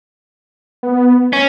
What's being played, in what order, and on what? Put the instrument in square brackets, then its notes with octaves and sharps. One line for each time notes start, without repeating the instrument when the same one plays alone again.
[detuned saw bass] B3
[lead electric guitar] C#4